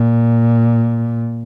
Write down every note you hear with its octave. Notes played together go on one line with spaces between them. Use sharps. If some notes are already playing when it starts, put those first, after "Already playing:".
Already playing: A#2